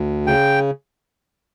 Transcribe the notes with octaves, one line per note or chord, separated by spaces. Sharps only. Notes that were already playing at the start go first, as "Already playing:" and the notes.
Already playing: D2
C#3 G5